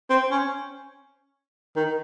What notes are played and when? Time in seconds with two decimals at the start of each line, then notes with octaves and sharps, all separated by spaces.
0.10 C4
0.31 C#4
1.76 D#3